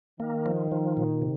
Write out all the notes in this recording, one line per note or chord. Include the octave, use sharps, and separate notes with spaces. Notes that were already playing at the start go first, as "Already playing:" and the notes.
D#3 A#3
F3
F3
A#2
C3